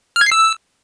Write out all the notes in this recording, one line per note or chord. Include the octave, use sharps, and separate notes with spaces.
F6
G#6
C7
E6